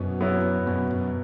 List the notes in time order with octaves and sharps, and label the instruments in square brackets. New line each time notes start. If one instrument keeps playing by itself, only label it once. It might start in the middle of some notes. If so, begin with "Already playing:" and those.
Already playing: [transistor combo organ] F#2 [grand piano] B2 B3
[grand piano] F#3 B3 E4
[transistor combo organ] F#2 [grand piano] B2
[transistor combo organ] F#2